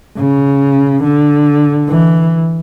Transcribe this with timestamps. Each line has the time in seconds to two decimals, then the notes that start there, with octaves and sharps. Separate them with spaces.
0.17 C#3
1.04 D3
1.89 E3